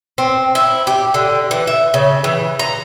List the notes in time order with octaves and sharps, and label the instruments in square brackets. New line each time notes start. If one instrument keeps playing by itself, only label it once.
[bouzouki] C4
E4
G4
D3
E3
E5
C#3
E3
A#5